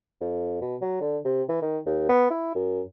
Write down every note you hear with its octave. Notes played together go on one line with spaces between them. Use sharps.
F2
B2
F#3
D3
C3
E3
D#3
D#2
B3
E4
F#2